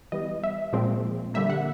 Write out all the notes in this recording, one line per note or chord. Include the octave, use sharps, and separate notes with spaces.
E3 G3 B3 D#5
E5
A#2 F3 G#3 C4
D3 G3 A#3 E5
F#5